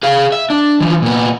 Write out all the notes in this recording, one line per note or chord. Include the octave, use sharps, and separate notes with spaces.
G#4 F5
E5
D4
E3 F3
A#2 B3